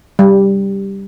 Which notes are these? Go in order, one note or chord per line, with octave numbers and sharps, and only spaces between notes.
G3